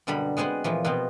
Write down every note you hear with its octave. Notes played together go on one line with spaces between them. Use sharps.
F#2 B2 D3 G3 A#5 B5
G#3 B3 C4 G#4 F#5 G#5
A#2 E3 F3
B2 F3 B3 C4